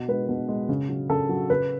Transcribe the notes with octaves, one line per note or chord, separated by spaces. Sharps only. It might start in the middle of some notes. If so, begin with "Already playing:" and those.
Already playing: B2
G#3 B4
B2
G#3
C#3
F#3
C#3 A4
F#3
C#3 B4